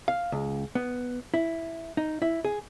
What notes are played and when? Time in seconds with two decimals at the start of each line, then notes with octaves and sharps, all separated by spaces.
0.08 F5
0.32 C#2
0.75 B3
1.34 E4
1.97 D#4
2.22 E4
2.45 G#4